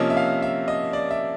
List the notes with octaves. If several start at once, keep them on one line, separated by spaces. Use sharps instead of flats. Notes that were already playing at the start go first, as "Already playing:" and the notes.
Already playing: C3 F3 A#3 C#4 D#5
E5
F5
E5
D#5
D5
E5